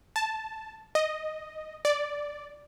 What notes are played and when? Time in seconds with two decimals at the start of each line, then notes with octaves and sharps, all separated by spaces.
0.16 A5
0.95 D#5
1.85 D5